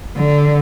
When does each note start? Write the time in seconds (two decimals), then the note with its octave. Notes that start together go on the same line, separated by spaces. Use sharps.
0.16 D3